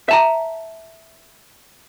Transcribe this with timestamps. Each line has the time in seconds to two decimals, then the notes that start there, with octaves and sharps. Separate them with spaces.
0.09 E5 A5 A#5